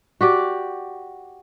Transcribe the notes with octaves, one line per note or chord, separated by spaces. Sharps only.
F#4 G4 D5